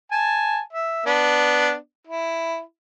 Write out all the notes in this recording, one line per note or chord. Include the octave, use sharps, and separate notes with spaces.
G#5 A5
E5
B3 D4
E4